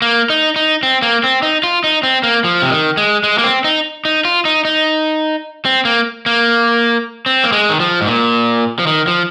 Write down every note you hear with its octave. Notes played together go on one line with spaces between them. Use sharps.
A#3
D#4
D#4
C4
A#3
C4
D#4
F4
D#4
C4
A#3
F3
C3
D#3
G#3
G#3
A#3
C4
D#4
D#4
F4
D#4
D#4
C4
A#3
A#3
C4
A#3
G#3
D#3
F3
G#2
A#2
F3
D#3
F3